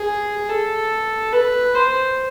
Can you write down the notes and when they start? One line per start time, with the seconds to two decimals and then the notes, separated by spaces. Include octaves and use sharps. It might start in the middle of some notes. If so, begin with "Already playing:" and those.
Already playing: G#4
0.49 A4
1.33 B4
1.75 C5